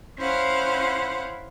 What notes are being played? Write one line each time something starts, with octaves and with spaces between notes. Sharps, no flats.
C#4 E4 C5 F5 F#5